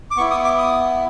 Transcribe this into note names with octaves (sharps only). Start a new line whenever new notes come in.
D6
B3 E4 C#6
D#6
D6
D#6